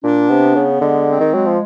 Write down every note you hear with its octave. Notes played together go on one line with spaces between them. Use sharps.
A#2 D4
C3 B3
C#3 B3
D3 G#3
C4
D#3
F#3 G#3
F3